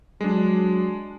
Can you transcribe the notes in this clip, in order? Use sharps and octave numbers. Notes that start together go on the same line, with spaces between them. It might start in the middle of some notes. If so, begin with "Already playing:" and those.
F#3 G#3 D4